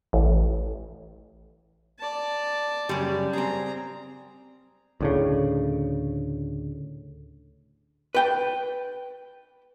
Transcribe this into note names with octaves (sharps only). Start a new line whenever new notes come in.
A1
D5 A5
F#2 C#3 G3
C4 G#4 A#5
D2 A2 C#3
B4 G5